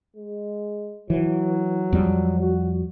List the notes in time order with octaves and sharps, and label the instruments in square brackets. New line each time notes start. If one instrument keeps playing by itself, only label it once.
[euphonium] G#3
[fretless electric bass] E3 [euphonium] F#3
[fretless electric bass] F2 G3
[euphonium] F#4